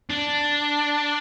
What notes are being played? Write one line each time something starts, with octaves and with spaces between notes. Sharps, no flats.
D4